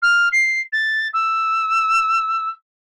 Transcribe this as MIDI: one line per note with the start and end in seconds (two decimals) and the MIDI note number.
0.02 0.29 89
0.32 0.60 96
0.72 1.08 93
1.13 2.49 88